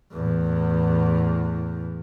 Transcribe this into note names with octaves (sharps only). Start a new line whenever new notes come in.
E2 A2